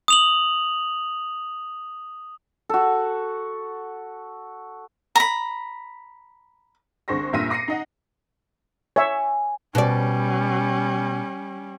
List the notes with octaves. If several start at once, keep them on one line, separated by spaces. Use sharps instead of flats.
D#6 F7 F#7
F#4 A4
A#5 B5
C2 D3 G#4 C5 C#6 A#6
F1 G2 A#2 E5 A#6 D#7
D6 A#6 C7 C#7 D#7
D#4 D#5 F#5
C#5 E5 G#5
B2 G3 C#4 D5